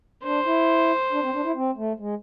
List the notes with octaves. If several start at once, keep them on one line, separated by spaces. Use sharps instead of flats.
D4 C5
E4
D4
C4
D4
E4
C4
A3
G#3